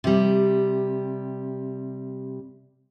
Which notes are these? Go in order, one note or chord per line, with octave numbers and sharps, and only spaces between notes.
C3 G3